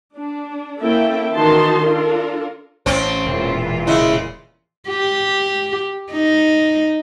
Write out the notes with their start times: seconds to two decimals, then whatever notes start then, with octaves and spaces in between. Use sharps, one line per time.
0.16 D4
0.82 A#3 C#4 E4 A4 E5 G5
1.34 D#3 E3 D#4 F#4 A5 C6
1.84 D4 F4 A4 A#4
2.86 A1 A2 C4 C#4
3.26 E1 A#2 E3 F4
3.87 C#3 G#3 E4
4.89 G4
6.12 D#4